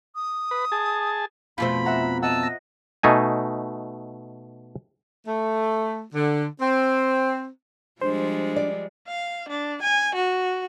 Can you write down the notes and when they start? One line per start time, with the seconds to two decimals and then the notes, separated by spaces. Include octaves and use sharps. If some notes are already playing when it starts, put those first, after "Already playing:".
0.15 D#6
0.51 B4
0.72 G#4 A5
1.58 F2 B2 A3 F4 C5 B5
1.85 E5 F#5 A#5
2.22 D#5 F#5 A5 E6
2.43 A#6
3.03 B2 A3 D#4 G#5
5.26 A3
6.13 D3
6.60 C4
8.02 F3 G3 G#3 D4 C5
8.56 D5
9.08 F5
9.49 D4
9.83 G#5
10.15 F#4